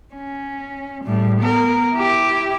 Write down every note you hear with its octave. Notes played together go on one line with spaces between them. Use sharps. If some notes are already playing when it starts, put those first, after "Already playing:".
C#4
A2 G3
B3 A#4
E4 G4